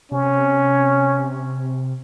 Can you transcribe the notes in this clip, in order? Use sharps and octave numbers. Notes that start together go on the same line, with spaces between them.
C3 C#4